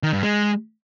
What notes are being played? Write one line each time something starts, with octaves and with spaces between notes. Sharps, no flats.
D#3
G2
G#3